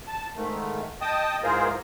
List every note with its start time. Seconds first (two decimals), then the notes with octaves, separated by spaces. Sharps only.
0.07 A5
0.36 G#2 D#3 A3
1.01 D#5 G5 A5 D#6
1.43 G#2 E3 F4 G#4 A#4 C5